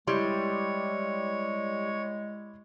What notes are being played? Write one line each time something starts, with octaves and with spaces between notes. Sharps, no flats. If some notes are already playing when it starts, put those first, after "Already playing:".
G3 G#3 E4 G4 C#5 C6